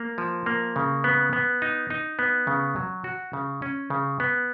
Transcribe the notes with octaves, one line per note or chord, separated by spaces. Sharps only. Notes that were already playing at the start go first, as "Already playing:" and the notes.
Already playing: A#3
F3
A#3
C#3
B3
B3
D#4
D#4
B3
C#3
F#3
F#4
C#3
C#4
C#3
B3